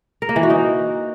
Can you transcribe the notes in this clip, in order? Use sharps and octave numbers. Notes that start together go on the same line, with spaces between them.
A#4
A#3
E3
F#4
D#4